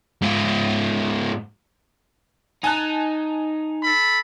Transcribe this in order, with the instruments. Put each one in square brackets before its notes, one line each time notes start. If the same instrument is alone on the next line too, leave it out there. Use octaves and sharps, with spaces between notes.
[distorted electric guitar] G#2 F4
[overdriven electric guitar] D#4 [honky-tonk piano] G#5 A5 F#6
[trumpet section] A4 B5